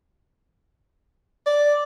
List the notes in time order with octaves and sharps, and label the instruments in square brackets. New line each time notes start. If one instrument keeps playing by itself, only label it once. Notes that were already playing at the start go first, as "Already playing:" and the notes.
[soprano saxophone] D5